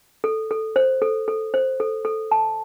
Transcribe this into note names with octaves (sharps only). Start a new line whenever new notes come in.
A4
A4
C5
A4
A4
C5
A4
A4
A5